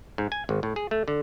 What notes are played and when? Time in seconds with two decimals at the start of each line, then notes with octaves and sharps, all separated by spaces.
0.18 G#2
0.32 G#5
0.49 G#1
0.63 A2
0.76 G#4
0.91 A3
1.08 D3